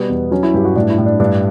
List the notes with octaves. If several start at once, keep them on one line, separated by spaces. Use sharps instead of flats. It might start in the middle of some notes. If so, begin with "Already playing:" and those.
Already playing: B2 G3 B3
E2
F#3 C#4
E4
G2 G4
F#4
A2 D4
E4
A2
D4
G2 D4